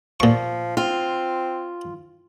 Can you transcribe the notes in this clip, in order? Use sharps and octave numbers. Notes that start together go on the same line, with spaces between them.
A#2 F3 C#6
C4 F4